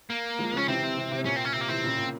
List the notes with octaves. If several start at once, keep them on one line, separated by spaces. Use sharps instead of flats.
A#3
F3 G#3
C#3 F3 C#4
C3 E3 C4
C3
C3
C3
A#2 C#4
C4
C#4
C3 C4
A#3
C3 E3 C4
A#2 C#3
A#2